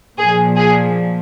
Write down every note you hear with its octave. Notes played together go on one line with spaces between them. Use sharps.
A#2 F3 G#4
G#4